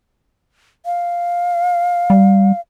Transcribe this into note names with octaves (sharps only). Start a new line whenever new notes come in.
F5
G3